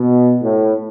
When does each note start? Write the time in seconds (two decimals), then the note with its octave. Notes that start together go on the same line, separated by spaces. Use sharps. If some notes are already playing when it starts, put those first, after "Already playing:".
Already playing: B2
0.42 A2